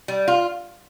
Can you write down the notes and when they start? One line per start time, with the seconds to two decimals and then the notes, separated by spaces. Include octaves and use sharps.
0.08 G3
0.28 F4